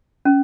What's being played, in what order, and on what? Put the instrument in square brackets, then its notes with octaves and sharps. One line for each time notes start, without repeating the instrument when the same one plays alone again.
[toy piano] C#4